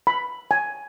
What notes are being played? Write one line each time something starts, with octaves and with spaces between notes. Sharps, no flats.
B5
G#5